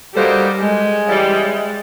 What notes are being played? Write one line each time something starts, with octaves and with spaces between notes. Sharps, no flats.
G3 A#3 D#4 F#4 A4 C5
G#3
C#3 E3 G3